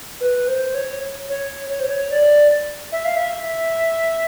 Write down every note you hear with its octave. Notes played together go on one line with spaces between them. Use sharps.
B4
C5
C#5
C#5
C#5
C5
C#5
D5
E5
F5
E5